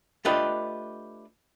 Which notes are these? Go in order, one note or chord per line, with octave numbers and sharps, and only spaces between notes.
A3 D4 F4 G4 B4 D#5